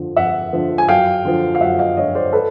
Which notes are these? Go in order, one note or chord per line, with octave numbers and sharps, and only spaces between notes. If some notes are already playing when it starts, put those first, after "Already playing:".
Already playing: F2 D3 F3
F2 E5 F#5
D3 F3
G#5
F#2 F5 G5
D3 F3
F5
F#2 E5 F#5
D#5 F5
D3 F3 C#5 D#5
C5 D5
A4 B4